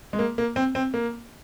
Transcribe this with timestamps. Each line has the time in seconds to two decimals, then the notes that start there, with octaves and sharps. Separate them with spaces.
0.13 G#3
0.19 A#3
0.38 A#3
0.56 C4
0.75 C4
0.94 A#3